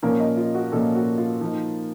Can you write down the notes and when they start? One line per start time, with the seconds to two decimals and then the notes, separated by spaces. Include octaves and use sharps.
0.03 A#2 F3 A#3 C#4 A#4
0.20 D#5
0.37 F4
0.55 F#4
0.72 A#2 F3 A#3 C#4 A4
0.95 F#4
1.18 F4
1.41 F3 A#3 D#4